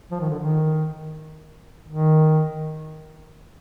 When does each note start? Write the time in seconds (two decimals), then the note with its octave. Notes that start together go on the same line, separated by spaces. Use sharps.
0.11 F3
0.20 D#3
0.29 D3
0.40 D#3
1.89 D#3